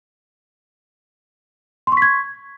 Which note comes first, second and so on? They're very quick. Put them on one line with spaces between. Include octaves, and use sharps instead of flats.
C6 C#6 B6 G#6